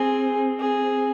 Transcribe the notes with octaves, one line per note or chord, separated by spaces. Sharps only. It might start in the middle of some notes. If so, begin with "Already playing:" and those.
Already playing: C4 G#4
G#4